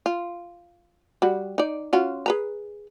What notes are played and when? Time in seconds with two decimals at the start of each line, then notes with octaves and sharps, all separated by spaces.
0.06 F4
1.22 G3 F#4
1.58 D#4 D5
1.93 C#4 F4 F#4
2.26 G#4 B4 A#5